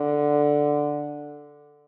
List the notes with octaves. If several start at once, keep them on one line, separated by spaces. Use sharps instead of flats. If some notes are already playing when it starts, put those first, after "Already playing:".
Already playing: D3